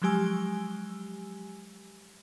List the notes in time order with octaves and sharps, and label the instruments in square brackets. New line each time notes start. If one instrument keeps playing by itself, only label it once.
[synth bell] F3 F#3 G#3 G4 G#5 E6